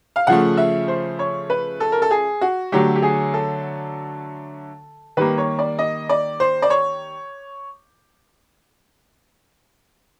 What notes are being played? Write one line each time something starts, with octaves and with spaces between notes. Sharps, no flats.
F5
C#3 F3 A3 F#5
E5
C5
C#5
B4
A4
A#4
A4
G#4
F#4
D3 F#3 A3 G4
G4
G#4
A4
D#3 G3 A#3 B4
C#5
D5
D#5
D5
C5
D5
C#5